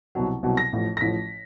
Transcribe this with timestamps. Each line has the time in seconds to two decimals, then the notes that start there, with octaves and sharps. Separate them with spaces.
0.15 C2 B2 F#3
0.43 C2 B2 F#3
0.57 A#6
0.73 A1 A2 F3
0.97 A#6
1.01 A1 A2 F3 B6